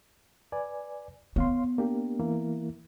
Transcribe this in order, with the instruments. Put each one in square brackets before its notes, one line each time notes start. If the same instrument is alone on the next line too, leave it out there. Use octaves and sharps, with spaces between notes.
[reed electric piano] B4 D5 G#5
[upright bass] B3 [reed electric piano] C#5 F5 C6
[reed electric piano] A#3 D4 G4
E3 A#3 E4